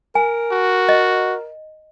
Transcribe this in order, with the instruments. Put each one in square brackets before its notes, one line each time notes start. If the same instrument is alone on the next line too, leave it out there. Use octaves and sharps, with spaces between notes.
[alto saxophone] A#4 [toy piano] G#5
[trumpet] F#4
[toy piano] D#5